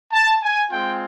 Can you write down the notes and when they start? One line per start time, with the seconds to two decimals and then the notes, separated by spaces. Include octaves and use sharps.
0.13 A5
0.43 G#5
0.71 G#3 C4 F4 G5